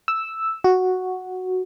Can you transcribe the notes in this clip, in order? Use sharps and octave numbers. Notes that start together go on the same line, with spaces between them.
E6
F#4